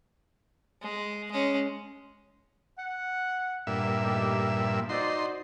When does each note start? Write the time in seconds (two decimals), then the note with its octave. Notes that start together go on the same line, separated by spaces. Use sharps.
0.82 G#3
1.32 G#3 C#4
2.78 F#5
3.67 G2 A#2 E5
4.03 A3 D#4 G4
4.58 F3
4.89 D#4 F#4 C5 D5 C6